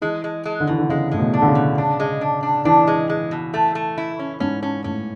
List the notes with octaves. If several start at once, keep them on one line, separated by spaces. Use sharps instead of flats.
E3 G#3
G#3
G#3
D3
B2 E3
D3
C#3 G#3
A2 G#3
B2
D4
D3
C#3
B2
D4
G#3
D4
D4
E3 D4
G#3
G#3
B2
A3
A3
E4
C#4
G#2 C#4
C#4
A2 C#4